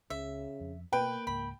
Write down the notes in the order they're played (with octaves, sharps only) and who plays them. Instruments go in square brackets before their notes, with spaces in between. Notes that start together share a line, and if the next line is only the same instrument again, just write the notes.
[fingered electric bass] C#2 [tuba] C#3 [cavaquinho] E5
[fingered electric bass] F2
[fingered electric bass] B2 [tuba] A#3 [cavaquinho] B4 [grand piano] G5
[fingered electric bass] C#2 G#2 [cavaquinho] B5